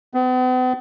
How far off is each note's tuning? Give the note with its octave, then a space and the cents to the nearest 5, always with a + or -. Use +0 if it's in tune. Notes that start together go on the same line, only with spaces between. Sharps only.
B3 +45